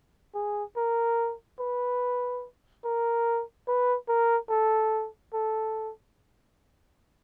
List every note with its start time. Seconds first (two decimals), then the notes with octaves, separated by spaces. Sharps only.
0.35 G#4
0.76 A#4
1.59 B4
2.84 A#4
3.68 B4
4.08 A#4
4.50 A4
5.34 A4